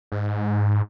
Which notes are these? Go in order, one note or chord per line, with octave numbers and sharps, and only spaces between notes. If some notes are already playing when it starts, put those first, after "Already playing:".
G#2